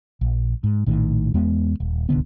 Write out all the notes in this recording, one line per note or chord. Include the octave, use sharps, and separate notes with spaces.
A#1
G#2
A#1 A2 D#3
E2 G#3 B3
D#1
D1 C2 D3 B3